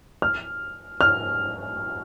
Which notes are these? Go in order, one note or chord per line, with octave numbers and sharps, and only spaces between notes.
F6
F6